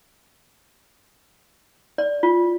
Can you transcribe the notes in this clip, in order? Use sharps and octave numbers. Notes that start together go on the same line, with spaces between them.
D5
F4